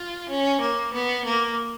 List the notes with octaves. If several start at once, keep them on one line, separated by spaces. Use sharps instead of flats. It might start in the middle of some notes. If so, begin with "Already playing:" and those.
Already playing: F4
C#4
A#3
B3
A#3